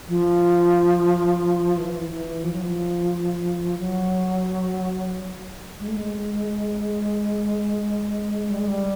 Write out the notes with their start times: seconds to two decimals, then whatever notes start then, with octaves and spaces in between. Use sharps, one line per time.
0.08 F3
1.77 E3
2.10 E3
2.44 F3
2.53 F#3
2.62 F3
3.78 F#3
5.80 G#3
5.88 A3
5.96 G#3
8.49 G3
8.59 G#3
8.68 G3